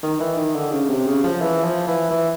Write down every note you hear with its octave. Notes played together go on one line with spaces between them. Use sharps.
D#3
E3
D#3
D3
C#3
C3
C#3
F3
E3
F3
E3
E3